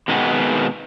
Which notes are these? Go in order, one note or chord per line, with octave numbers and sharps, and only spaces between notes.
B2 D#3 G#3 B3 C4